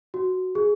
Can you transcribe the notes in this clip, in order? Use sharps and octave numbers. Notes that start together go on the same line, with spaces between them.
F#4
G#4